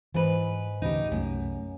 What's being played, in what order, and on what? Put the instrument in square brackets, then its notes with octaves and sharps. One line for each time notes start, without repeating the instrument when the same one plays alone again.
[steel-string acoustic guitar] G#2 B4 [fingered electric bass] E3
[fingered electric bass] A1 D2 C#3 [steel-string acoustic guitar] D#4 G4
[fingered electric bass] C2 A3 [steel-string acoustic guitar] F#2